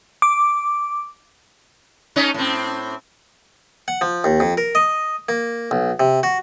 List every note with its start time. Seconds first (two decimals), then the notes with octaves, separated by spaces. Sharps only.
0.22 D6
2.16 A3 C#4 D#4
2.34 A2 C4
3.88 F#5
4.01 F3
4.24 D#2
4.40 F2
4.58 A#4
4.75 D#5
5.29 A#3
5.71 B1
6.00 C3
6.23 F#4